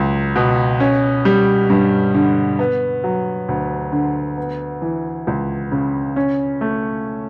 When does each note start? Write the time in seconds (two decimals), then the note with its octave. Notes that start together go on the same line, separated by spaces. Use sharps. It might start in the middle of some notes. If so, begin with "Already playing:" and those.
Already playing: C#2 F#3
0.35 B2
0.80 C#4
1.25 G3
1.70 G2
2.14 D3
2.59 B3
3.04 F#3
3.48 D2
3.92 D3
4.37 B3
4.82 E3
5.27 C#2
5.72 C#3
6.16 C#4
6.61 A3